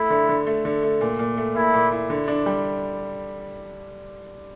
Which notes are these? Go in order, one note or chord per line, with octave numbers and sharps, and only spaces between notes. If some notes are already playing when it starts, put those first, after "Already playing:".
Already playing: A3 E4
D3
D3
A3
D3
A3
A#2
A#2
A3
A#2 E4
A#2
E4
D3
D4
G3